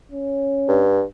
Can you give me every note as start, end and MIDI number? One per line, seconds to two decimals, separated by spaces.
0.12 0.84 61
0.68 1.02 43